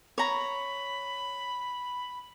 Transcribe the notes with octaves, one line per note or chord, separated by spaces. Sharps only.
C#5 A#5 B5